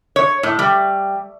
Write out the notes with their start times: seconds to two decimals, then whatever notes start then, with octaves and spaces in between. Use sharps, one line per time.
0.16 C#5
0.43 A2
0.59 G3